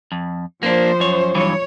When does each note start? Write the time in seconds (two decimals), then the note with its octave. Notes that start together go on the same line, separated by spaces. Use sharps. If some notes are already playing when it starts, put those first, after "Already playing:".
0.12 F2
0.63 F3 A#3 B3 D4 C5
1.00 F#2 C#5
1.35 G2 E3 F#3 C#5